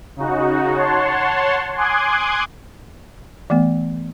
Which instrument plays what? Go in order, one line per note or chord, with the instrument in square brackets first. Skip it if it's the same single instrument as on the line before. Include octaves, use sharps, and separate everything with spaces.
[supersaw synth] C#3 D#4 F#4
C#5 F#5 A5 C6
G#5 C6 D6 D#6 F#6 G#6
[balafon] E3 A3 B3